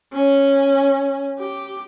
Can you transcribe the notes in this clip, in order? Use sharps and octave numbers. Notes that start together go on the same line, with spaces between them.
C#4
G4